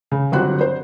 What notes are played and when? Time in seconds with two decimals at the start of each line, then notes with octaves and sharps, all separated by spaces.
0.12 C#3
0.32 G1 F#3 C4 F#4 G4 F#6
0.61 C5